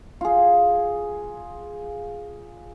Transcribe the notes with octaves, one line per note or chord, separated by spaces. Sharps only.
F4 G#4